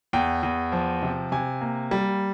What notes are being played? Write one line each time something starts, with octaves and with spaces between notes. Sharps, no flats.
E2 G5
E2
F3
C3
C3 G#5
A#3
G3